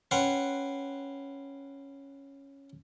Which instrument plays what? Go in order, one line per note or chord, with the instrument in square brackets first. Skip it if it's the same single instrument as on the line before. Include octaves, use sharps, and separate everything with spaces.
[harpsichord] C#4 B4 F#5 G5 C6